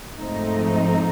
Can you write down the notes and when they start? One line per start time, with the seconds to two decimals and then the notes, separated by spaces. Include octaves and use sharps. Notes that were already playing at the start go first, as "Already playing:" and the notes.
0.18 G#2 F3 A3 C4 D#4